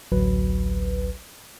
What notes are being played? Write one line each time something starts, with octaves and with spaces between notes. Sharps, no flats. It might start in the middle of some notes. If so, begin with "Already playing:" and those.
A1 D2 F#3 B4